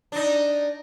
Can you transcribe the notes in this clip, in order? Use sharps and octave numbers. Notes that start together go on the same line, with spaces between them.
D4 D#4